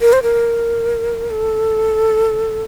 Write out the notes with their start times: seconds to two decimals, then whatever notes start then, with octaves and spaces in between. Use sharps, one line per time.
0.01 A#4
0.13 C5
0.23 A#4
1.30 A4